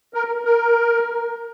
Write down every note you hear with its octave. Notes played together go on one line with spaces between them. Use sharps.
A#4
A#4